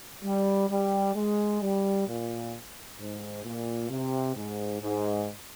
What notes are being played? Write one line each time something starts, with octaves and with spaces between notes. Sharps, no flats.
G3
G3
G#3
G3
A#2
G#2
A#2
C3
G#2
G#2